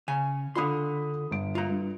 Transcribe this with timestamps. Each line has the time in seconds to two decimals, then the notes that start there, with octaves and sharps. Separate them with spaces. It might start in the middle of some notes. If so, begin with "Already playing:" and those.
0.08 C#3 G#5
0.55 D3 F4 B5 C6 D#6
1.31 G1 D7
1.55 F4 A#5
1.70 G2